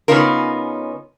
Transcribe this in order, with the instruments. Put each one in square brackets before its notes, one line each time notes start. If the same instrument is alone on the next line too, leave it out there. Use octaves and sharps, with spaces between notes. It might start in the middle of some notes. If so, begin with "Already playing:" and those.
[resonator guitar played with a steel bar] C#3 B3 C#4 D#4 F4 A#4